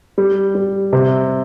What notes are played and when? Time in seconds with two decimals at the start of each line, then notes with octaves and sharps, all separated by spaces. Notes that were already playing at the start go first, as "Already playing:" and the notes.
0.18 G3
0.55 G3
0.93 C3